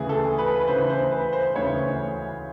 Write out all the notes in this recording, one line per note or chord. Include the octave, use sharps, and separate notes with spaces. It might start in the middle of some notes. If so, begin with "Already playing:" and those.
Already playing: D2 C#3 E3 G#4
A4
B4
B4
D2 C#3 E3 C5
C5
B4
C5
D2 C#3 E3 C#5